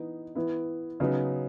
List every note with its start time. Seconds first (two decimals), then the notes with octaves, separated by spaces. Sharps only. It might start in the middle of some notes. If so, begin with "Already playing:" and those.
Already playing: E3 B3 D#4
0.35 E3 B3 E4
1.00 C#3 F#3 B3 D#4